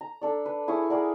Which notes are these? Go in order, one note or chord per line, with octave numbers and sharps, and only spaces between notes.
A#5
D4 A4 D5
B4
E4 G#4 C#5 G#5
G#4 A#4 D5 F#5